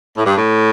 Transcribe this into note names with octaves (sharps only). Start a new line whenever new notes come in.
A2
G2
A2